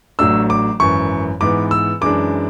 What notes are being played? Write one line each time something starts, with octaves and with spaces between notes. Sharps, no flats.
A1 A2 F#3 A3 D4 E6
D6
G#1 F#2 E3 C#6
G#2 E3 B3 D6
E6
F#2 E3 G#3 D4 D6